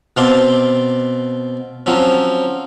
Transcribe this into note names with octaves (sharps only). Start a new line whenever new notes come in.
B2 C4 F5 A5 C6 D6
F3 F#3 C4 C#4